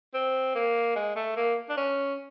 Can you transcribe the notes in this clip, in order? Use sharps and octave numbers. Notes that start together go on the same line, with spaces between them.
C4
A#3
G#3
A3
A#3
D4
C#4